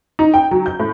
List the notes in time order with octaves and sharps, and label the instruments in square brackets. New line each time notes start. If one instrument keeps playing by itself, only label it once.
[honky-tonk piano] D#4
G5
F#3
G6
A2